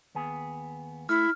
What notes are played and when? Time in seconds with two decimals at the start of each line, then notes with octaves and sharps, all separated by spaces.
0.15 D#2 B3 G#4
1.09 A3 E4 F6